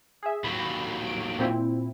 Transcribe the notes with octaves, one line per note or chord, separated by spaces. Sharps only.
G#4 E5
D#2 F#3 B5
D7
A#2 C4 E4